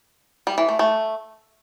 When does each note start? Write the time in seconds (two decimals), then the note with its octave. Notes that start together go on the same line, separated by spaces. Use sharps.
0.47 G3
0.58 E3
0.68 A3
0.79 A3